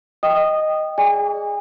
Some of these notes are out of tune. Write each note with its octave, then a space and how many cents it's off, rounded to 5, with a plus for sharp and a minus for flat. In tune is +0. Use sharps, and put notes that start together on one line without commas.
D#5 +0 G5 +0 D#6 -20
G#4 +0 D5 +0 G#5 -35